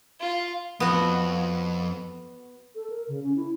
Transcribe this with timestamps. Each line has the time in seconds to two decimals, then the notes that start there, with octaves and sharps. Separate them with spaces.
0.20 F4
0.80 F2 B3 F#4
2.75 A4
2.90 A#4
3.08 C#3
3.23 C#4
3.36 E4